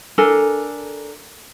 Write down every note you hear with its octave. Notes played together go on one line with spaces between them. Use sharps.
D4 A4 A#4 G#5